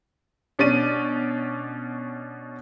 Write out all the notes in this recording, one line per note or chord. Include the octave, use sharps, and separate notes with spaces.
B2 C#4 D4 D5 D#7